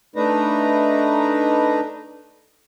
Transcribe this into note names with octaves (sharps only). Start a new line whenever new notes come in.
A3 D4 D#4 B4 A#5